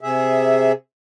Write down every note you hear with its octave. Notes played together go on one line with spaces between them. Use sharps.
C3 G#4 E5